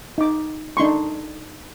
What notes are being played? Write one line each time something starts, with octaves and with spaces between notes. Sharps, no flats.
D#4 D6
D4 D#4 C6 C#6